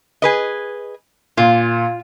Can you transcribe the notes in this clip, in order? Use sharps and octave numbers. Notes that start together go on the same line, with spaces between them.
G#4 B4 D#5
A#2 F4